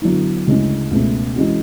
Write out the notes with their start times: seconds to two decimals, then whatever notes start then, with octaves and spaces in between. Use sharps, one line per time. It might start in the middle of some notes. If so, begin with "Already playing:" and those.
0.02 D3 F#3 B3 E4
0.46 D2 C#3 G#3 C#4 E4
0.91 C#2 B2 A3 C#4
1.36 E3 G#3 C#4 F#4